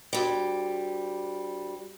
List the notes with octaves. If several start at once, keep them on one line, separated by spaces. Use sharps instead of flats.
D2 G3